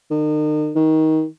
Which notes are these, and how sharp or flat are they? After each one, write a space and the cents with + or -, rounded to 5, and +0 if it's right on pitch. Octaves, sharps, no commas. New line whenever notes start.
D#3 -40
D#3 +20